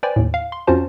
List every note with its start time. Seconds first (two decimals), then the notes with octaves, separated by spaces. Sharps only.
0.03 B4 C5 D5 G5 G#5
0.16 D#2 A2
0.34 F5
0.52 C6
0.67 F2 C#4 F4 F#4 C5 A5